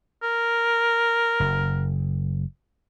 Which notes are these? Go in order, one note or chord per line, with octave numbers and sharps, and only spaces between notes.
A#4
F#1